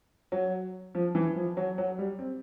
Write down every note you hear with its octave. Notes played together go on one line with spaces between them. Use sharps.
F#3
F3
E3
F3
F#3
F#3
G3
C4